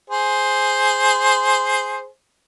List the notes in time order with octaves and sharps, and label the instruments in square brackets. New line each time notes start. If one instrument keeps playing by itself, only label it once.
[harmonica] G#4 C5